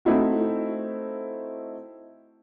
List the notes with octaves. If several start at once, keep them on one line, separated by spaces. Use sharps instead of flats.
A3 C4 D#4 E4 F#4